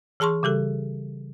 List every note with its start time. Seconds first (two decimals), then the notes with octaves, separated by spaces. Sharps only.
0.20 E3 G#4 A5 C6 C#6
0.43 C#3 G3 G4 A4